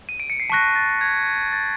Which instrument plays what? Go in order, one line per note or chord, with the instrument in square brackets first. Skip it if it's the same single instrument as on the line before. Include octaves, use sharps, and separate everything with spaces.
[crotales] D#7
D7
C#7
C7
[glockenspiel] A5 C#6 F#6 A#6 [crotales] B6
[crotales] A6
G#6
A6